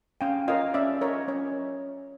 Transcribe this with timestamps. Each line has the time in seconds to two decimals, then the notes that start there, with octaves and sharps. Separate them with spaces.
0.21 C#4 F5 G5
0.48 F4 A#4 C#5 D#5 F5
0.74 C#4 D5 E5
1.01 F4 A#4 C#5 D#5
1.28 C#4 C#5